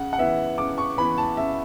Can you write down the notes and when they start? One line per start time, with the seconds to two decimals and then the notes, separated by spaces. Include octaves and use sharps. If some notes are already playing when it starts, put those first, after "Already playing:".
Already playing: C#3 F#5
0.13 F#5
0.18 E3 B3 E5
0.58 C#3 D6
0.78 C#6
0.98 E3 B5
1.01 B3
1.18 A5
1.37 C#3 E5